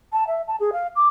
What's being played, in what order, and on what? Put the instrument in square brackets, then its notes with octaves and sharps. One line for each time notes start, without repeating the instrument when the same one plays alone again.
[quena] A5
E5
A5
G#4
F5
D6